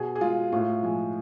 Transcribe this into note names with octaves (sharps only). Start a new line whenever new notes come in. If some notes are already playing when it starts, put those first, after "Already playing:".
Already playing: B2 G#4
G#4
G#3 F4
A2 F4
F3 G#3